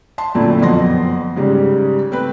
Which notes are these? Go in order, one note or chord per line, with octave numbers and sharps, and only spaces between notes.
A5 C6
F#2 A#2 D3 A3 C4 E4
F#1 F2 B3 C6 A#6
G#2 C#3 G3
A3 C4 B4